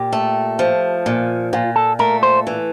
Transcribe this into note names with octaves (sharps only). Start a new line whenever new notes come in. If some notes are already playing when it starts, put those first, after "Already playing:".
Already playing: A#2 G4
A3
F3
A#2
A#2 F4
A4
A3 A#4
C5
E3